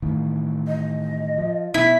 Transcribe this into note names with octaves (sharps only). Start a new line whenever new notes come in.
A2 D#3 E3
D#5
F3
B2 E4 B6